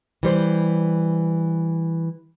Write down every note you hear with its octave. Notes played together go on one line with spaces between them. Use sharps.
E3 G3 C5